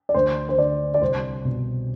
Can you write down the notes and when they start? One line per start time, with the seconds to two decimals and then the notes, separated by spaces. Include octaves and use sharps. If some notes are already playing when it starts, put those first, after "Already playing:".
0.09 D5
0.14 D2 C5
0.49 C5
0.58 D3 D5
0.94 D5
1.01 C2 C5
1.45 B2